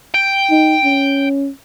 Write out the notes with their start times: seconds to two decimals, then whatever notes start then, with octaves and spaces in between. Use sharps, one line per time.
0.14 G5
0.51 D#4
0.84 C#4